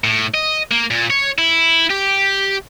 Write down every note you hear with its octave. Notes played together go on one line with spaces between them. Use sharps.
A2
D#5
A#3
A#2
C#5
E4
G4